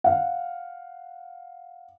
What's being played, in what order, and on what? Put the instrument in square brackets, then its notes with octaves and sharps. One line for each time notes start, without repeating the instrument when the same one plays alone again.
[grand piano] F5 F#5